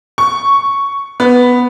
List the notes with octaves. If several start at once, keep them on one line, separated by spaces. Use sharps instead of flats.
C#6
B3